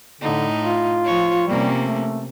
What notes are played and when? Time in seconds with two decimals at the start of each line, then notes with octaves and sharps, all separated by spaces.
0.21 A2 D3 D#4
0.61 F4
1.05 F3 C#5
1.47 C3 G3 A#3 C#4
1.80 A3